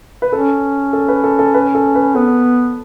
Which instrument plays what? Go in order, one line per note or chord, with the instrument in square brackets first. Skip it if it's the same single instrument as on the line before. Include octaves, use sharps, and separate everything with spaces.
[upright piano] B4
[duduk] C#4 [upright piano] A4
[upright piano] A4
B4
A4
A4
B4
A4
B4
[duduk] B3 [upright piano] A4